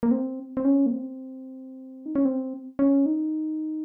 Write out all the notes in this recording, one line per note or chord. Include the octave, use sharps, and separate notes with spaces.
A#3
C4
C4
C#4
A#3
C4
D#4
C#4
C4
C#4
D#4